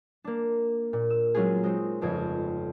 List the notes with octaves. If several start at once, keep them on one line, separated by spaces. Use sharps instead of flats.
A#3 D4
A#2
E6
F#3 G#3 C#4 F4 G#4
G#3 C4 D#4
G1 F2 C#3 G#6